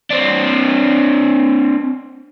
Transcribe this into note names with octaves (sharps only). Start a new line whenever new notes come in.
C4 D4